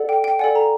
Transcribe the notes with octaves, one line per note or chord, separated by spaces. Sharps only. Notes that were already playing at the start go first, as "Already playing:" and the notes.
Already playing: A4 D5 F#5
G5
G5
A4 D5 F#5 G#5
A#5